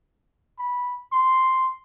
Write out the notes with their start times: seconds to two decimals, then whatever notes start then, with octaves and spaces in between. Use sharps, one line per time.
0.59 B5
1.12 C6